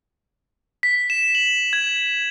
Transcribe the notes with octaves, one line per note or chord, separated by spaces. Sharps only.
B6
E7
F#7
G#6